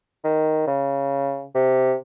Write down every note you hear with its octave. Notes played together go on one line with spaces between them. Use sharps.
D#3
C#3
C3